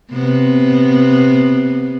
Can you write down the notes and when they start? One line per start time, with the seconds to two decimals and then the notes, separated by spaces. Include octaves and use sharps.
0.12 C3 B3